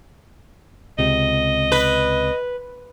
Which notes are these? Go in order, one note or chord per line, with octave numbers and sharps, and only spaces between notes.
C#2 C3 D#5
B4